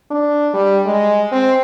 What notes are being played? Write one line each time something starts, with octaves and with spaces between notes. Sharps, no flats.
D4
G3
G#3
C4